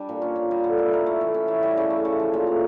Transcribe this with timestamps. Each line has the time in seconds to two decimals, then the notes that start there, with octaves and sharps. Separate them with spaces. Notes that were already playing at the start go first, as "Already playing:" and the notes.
Already playing: G3 D4
0.09 A#2
0.22 C#4
0.36 A#2
0.51 G3
0.64 D3
0.78 E4
0.93 A#4
1.06 A3
1.21 E3
1.34 C#4
1.48 E3
1.63 G3
1.77 C#3
1.90 A3
2.05 C#3
2.19 F3
2.33 A#2
2.47 A3